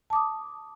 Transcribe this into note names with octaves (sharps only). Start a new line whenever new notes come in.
A5 D6 D#6